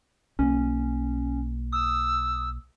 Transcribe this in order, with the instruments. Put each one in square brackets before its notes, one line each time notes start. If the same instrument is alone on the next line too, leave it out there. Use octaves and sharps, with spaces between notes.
[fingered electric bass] B1 A#3 [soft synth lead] C#4
[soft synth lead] D#6 [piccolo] E6